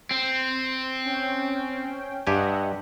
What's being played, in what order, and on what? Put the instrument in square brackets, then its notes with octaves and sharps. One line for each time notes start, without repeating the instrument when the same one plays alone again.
[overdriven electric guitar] C4
[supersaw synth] C#4 G5
[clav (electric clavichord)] G2 G4 G#5 [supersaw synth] D#5 E5 F#5